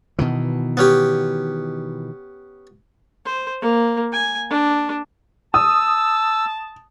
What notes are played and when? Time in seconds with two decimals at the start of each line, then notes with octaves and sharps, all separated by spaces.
0.19 B2 D#3 E3
0.77 B3 C#4 G4
3.25 C5
3.62 A#3
4.13 G#5
4.50 D4
5.54 A5 D#6 E6